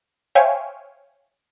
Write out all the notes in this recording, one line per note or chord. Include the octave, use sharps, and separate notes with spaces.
C5 C#5 E5 F5 G5 G#5